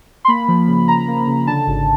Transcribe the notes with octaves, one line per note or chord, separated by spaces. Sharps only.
C6
A#3 B5
F3
C#3
C#3 A#5
A#3
C#3
D3 A5
G#1